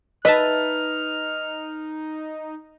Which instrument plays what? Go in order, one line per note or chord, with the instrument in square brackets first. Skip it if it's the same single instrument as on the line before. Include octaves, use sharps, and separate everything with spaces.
[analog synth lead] D#4 [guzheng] B4 E5 A5 [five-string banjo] D#5 [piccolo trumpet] F6